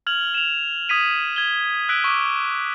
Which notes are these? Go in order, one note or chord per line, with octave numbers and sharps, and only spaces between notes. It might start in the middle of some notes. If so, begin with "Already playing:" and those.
F6 G#6 F7 F#7
E7 F7
D#6 G#6 B6 D#7
G#6 G7
E6 F#6 B6 D7
C#6 D6